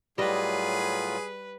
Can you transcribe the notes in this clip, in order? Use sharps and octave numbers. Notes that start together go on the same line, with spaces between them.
A2 F#3 G3 F4 G#4 B4 D#5